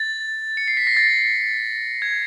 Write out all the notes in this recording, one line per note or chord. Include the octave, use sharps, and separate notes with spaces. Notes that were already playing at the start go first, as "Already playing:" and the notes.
Already playing: A6
C#7
C7
B6
A#6
A6
G#6